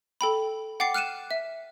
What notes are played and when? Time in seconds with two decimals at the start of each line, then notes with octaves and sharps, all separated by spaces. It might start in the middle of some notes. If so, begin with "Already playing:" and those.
0.21 A4 G5 B5
0.80 F#5 G5 D6 A6 C7
0.94 F6 F#6 C#7 D#7 E7
1.31 E5